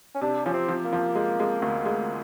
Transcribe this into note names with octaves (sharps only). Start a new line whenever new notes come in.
C#4
C3 D4
F3 C#4
C4
F3
A#3
F3
G#3
G#3
D2
G#3